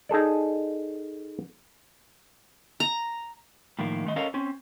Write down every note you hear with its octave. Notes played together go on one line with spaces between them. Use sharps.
D#4 G#4 A4 D5
A#5
A2 D#3 F3 A#3
D#3 A3 D#5
C#4 A4 A#4 C#5 D#5 F5
C4 C#4